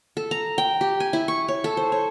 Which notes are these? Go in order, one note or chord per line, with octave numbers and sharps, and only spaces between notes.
A4
A#5
G5
G4
G#5
E4
C#6
C#5
A4
C5
C#5